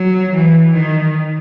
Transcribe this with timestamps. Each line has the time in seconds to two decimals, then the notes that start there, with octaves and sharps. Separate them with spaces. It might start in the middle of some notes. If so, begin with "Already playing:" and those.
Already playing: F#3
0.32 E3
0.74 D#3